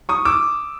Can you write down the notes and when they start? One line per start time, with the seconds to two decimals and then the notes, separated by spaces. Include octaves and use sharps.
0.09 C#6 D#6
0.25 D6 E6